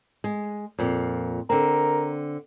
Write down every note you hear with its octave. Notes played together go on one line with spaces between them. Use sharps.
G#3
F2 A#2
D3 C4 A#4